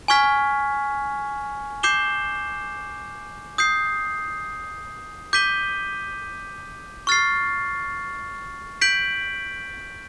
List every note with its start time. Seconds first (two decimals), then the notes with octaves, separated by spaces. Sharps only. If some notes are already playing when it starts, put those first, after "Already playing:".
0.08 G#5 C#6 F6 G#6 B6
1.83 D6 G6 C7 E7 G7
3.58 D#6 G6 C7
5.33 D6 G6 B6 D#7 G7
7.07 C#6 F6 A6 C7
8.81 G6 B6 D7 F#7